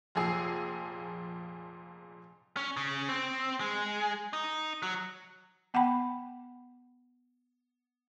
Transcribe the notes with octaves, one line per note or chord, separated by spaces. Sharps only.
F1 F2 A#2 G#4 E6 C7
C#4
C#3
C4
G#3
D#4
F#3
B3 F#5 G5 A5 B5